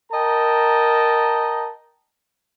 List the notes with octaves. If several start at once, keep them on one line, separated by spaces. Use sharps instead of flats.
A#4 D#5 G5 A5 A#5